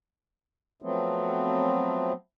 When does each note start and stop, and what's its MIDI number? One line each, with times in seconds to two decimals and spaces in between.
0.82 2.12 53
0.82 2.12 54
0.82 2.12 57
0.82 2.12 59
0.82 2.12 60